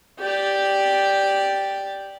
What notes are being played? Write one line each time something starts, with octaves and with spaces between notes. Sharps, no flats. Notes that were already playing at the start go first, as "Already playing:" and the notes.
G4 D5